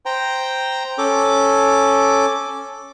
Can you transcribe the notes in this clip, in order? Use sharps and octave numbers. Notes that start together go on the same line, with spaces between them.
C5 G5 A#5
C#4 A4 D6